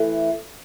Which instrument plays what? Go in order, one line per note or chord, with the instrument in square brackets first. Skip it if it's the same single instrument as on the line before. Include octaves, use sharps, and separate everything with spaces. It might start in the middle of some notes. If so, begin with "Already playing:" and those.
Already playing: [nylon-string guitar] E3 A3 E4 A4